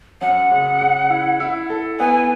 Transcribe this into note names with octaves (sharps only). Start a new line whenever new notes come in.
F#2 F#5
C#3
C#3
E4
E4
A4
B3 G#5